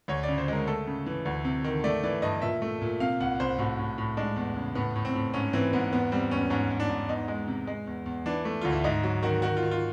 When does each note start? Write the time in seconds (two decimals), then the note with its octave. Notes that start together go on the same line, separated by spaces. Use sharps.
0.08 D2 C#5
0.23 D5
0.28 C#3
0.38 C5
0.48 G#3 A#4
0.67 A3 A4
0.87 C#3
1.06 E3
1.25 D2
1.44 C3
1.64 D#3
1.84 A3 D5
2.03 E3 D5
2.22 G2 D#5
2.42 A#2 E5
2.62 A3
2.82 A#2
3.00 C3 F5
3.20 C2 F#5
3.40 C2 C5
3.58 A2 F#4
3.79 A2
3.98 A2
4.17 G#3 D4
4.36 E2
4.57 C#3
4.75 A2 B3
4.96 A2
5.05 C4
5.15 A2
5.33 G#2 C#4
5.53 E3 C4
5.73 G#2 B3
5.93 E2 B3
6.12 G3 C4
6.31 E2 C#4
6.50 G#2 C#4
6.70 G#2
6.80 D4
6.89 G#2
7.08 E2 D#4
7.28 G#3
7.47 C3
7.67 G#3
7.87 E2
8.06 E2
8.26 E3 D4
8.45 A3
8.61 D2 F4
8.72 E4
8.84 G#2 D#4
9.03 F#3
9.23 D#3 F#4
9.42 D#3 F#4
9.57 F4
9.63 D#3
9.71 F4